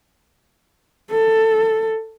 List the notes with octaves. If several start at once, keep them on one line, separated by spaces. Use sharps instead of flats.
A4